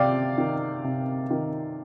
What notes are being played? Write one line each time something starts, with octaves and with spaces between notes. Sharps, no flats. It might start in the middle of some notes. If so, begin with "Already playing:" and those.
Already playing: C3 D5 F5 G5
D#3
C3
D#3